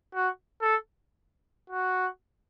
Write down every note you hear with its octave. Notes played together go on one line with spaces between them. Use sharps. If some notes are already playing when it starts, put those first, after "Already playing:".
F#4
A4
F#4